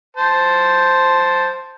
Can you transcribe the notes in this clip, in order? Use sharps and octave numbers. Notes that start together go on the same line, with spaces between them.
C5 A5